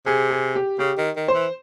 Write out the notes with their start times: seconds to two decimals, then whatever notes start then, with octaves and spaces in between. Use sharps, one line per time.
0.06 C3 G#4
0.31 G#4
0.55 G4
0.79 C#3 G4
0.98 D#3
1.16 D#3
1.28 C5
1.34 E3